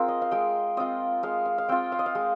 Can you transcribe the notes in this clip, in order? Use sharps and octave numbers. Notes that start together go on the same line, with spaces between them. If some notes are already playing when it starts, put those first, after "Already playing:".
Already playing: C4 F4 G#4 A#4
D#5
F5
G#3 G5
C4 F4 D#5
G#3 F5
F5
F5
C4 F4 G5
F5
D#5
F5
G#3